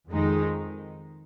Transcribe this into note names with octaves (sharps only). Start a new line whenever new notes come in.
F2 D#3 G#3 D#4